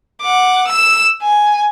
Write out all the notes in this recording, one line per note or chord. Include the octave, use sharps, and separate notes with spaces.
F#5 D6
E6 E7
G#5